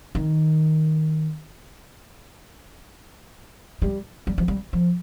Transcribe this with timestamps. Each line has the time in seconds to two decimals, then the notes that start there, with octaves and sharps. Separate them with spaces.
0.15 D#3
3.82 G3
4.27 G3
4.38 F3
4.48 G3
4.73 F3